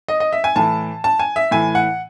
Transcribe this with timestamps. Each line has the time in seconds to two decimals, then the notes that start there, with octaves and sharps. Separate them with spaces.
0.08 D#5
0.20 D#5
0.33 E5
0.44 G#5
0.56 A2 E3 A5
1.04 A5
1.19 G#5
1.36 E5
1.51 A2 E3 G#5
1.75 F#5